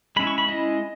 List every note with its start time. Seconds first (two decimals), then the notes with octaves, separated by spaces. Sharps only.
0.16 G#3 C#4 E4 B5
0.27 C#6
0.38 B5
0.48 G#3 C#4 E4 D#5